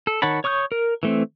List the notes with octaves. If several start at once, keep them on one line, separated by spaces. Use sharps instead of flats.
A4
D#3 C#5 F#5 A5 B5
C#5 C#6 D#6 F6 G6
A#4
E3 A3 C4